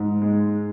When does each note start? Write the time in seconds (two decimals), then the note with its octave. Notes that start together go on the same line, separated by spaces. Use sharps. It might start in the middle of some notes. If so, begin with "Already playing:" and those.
Already playing: G#2
0.22 G#3